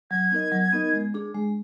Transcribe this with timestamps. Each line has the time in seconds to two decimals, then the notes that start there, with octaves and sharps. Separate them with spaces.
0.11 F#3 G#6
0.31 B3 D#4 A#4 D#5
0.52 F#3
0.73 B3 D#4 A#4 D#5
0.93 G#3
1.14 D4 G#4
1.35 G#3